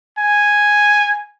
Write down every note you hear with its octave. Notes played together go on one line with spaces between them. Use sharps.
G#5